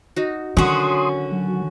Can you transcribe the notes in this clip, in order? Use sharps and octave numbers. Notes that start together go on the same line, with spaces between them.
D#4 F#4
D3 D#3 F#3 C#4 F#4 F#5 C6 D#6
F#3